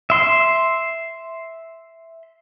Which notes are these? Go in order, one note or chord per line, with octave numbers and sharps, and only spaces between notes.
E5 C6